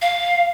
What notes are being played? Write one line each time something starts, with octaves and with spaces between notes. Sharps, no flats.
F5